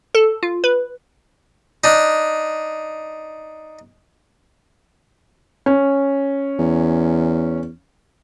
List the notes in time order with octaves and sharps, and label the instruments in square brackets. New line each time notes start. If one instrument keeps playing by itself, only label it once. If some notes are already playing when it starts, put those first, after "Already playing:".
[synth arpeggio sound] A4
F4
B4
[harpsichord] D4 D#4
[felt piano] C#4
[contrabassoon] E2